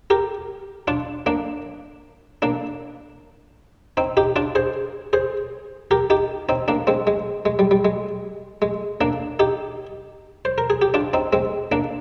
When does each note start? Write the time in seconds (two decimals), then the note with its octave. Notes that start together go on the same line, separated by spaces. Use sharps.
0.10 G4 A#4
0.88 D4 F4
1.26 A#3 D4
2.42 A#3 D4
3.97 C4 D#4
4.17 D#4 G4
4.36 D4 F4
4.55 G#4 C5
5.13 G#4 C5
5.91 G4 A#4
6.10 D#4 G4
6.49 C4 D#4
6.68 A#3 D4
6.87 G#3 C4
7.07 G#3
7.45 G#3
7.59 G3
7.71 G3
7.85 G#3
8.62 G#3
9.01 A#3 D4
9.39 D#4 G4
10.45 C5
10.58 A#4
10.70 G#4
10.82 G4
10.94 D4 F4
11.13 C4 D#4
11.33 G#3 C4
11.72 A#3 D4